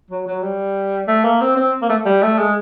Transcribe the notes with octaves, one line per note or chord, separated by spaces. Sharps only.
F#3
F#3
G3
A3
A#3
C4
C4
A#3
A3
G3
A3
G#3